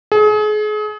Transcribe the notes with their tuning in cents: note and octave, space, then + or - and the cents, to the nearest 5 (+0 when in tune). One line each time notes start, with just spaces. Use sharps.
G#4 +35